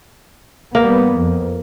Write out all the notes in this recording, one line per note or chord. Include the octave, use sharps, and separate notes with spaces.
G3 A#3 B3
F2